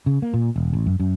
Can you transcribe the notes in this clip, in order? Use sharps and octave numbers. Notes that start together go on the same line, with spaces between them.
C#3
A#3
A#2
E1
A1
F#2
F#2